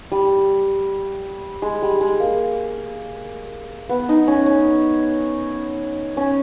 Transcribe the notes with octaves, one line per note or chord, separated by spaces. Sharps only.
G3
G#3
G3
G#3
A#3
B3
D#4
C#4
C#4
C#4